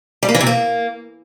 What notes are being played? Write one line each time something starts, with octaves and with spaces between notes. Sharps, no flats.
G3
A#3
E3
C3
A#3